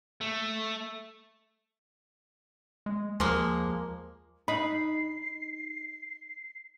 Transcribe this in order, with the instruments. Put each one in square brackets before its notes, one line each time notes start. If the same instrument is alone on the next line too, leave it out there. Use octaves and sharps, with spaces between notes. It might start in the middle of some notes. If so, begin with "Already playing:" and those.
[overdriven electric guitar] A3
[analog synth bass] G#3
[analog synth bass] D#2 [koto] F3 G#3 A#3
[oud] D#4 [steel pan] B5 [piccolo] C7